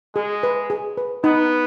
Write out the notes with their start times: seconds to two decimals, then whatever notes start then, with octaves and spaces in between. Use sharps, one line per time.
0.15 G#3 G#4
0.43 B4
0.70 G#4
0.97 B4
1.24 B3 D#4